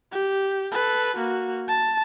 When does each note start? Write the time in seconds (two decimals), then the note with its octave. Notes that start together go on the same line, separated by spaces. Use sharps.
0.12 G4
0.72 A4 B4
1.16 A#3 F#4
1.68 A5